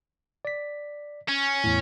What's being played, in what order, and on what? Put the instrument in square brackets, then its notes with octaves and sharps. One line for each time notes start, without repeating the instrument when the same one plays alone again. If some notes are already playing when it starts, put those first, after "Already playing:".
[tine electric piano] D5 B6
[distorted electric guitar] C#4
[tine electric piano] E2 A2